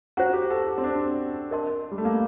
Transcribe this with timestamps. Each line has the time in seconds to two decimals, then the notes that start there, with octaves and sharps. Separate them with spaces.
0.17 F#4 C5 F#5 A#5
0.33 G4
0.50 A4
0.67 G4
0.78 C4
0.84 D4
1.51 A#4 D#5 A5 C6
1.92 G3
1.98 A3
2.05 A#3